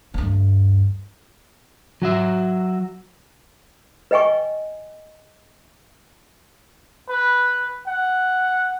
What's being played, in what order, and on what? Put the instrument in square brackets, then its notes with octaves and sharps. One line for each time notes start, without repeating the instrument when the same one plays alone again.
[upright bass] D2 G2
[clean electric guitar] F#3 F#4 E5
[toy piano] B4 D#5 G5 G#5 C#6
[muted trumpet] B4
F#5